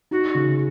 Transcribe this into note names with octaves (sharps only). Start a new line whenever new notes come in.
D#4 F#4
C#3